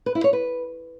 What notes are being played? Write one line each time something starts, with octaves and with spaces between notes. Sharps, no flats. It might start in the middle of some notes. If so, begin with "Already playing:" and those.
B4
E4
C#5
B4